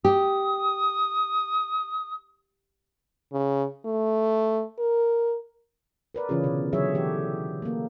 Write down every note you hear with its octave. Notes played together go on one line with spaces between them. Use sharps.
G4 D#6
C#3
A3
A#4
A#4 B4 D5
C#3 E3 C#4 F4 G#4
B2 D3
B2 D3 F#3 G#4 C#5 E5
E3 G4 A4
A3 A#3